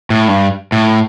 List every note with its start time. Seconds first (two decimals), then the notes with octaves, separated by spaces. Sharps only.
0.10 A2
0.28 G2
0.72 A2